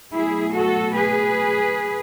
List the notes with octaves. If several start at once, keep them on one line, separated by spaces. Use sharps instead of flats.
B2 F#3 A3 E4 G#4
F#4 A4
G#4 B4